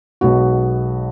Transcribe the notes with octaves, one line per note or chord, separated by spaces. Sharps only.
B1 B2 G#3 B3 F#4